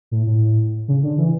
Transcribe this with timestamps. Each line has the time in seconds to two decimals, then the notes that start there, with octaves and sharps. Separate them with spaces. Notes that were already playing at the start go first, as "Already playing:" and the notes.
0.11 A2
0.27 A2
0.88 C#3
1.03 D3
1.18 E3